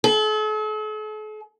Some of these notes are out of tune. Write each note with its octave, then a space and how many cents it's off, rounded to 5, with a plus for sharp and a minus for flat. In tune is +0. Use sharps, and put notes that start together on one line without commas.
A4 -45